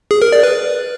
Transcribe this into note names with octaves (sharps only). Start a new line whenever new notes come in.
G#4
A#4
D5
B4